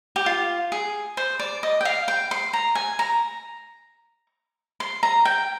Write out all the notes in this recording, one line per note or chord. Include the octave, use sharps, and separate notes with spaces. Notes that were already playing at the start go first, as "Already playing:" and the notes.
G4
F4
G#4
C5
D5
D#5
G5
F5
G5
C6
A#5
G#5
A#5
C6
A#5
G5